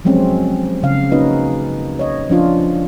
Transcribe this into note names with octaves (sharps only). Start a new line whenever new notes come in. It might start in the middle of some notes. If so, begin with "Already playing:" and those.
F3 F#3 G#3 C4 C#4
C#3 F5
A#3 C#4 D#4 F#4 B4 D#5
C#5 D#5
F3 C#4 D4 F4